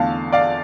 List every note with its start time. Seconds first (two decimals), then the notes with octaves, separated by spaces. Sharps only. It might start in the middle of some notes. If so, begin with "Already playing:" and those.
Already playing: E2 D3 A3 F5 A5
0.32 D5 F5